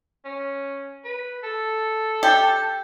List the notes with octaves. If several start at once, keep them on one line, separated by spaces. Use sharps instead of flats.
C#4
B4
A4
G4